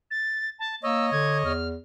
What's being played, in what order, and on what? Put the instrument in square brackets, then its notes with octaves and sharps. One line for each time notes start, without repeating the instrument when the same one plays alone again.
[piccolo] A6
A5
[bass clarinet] A#3 [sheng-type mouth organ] C#5 D#5 [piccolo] E6
[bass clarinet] D3 [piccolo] G#6
[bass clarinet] E2 [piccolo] F6